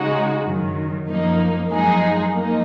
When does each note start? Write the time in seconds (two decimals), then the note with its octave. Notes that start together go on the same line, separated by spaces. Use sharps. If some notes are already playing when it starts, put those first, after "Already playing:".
Already playing: C#3 G#3 D#4 F#4
0.45 F#2 D#3 F#3
1.08 F#2 F3 A#3 D#4
1.70 F#2 F3 G#3 D#4 G#4
2.32 F3 A#3 D#4